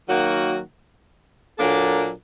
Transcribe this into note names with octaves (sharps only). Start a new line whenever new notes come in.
D#3 F#3 A#3 F#4
A#2 F#3 A#3 D4 A4